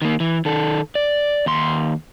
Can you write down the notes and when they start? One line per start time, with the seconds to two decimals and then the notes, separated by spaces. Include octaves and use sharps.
0.02 D#3 A#3
0.20 E3
0.45 D#3 A4
0.95 D5
1.46 D#2 C6